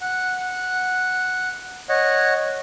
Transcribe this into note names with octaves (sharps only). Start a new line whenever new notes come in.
F#5
C#5 D#5 F#5